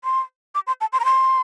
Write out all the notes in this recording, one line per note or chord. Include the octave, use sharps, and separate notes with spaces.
C6
D6
C6
A5
C6
A#5
C6